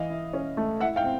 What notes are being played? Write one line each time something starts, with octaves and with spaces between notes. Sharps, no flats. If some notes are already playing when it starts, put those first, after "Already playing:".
Already playing: E3 D#5 F5
E4
C#4
A3
E4 E5 F#5
F5 G5
C4